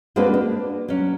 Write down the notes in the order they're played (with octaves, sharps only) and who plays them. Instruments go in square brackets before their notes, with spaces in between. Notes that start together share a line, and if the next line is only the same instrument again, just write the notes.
[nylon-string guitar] G#3 A#3 C4 D4 F#4 B4
D4
F#3 C#4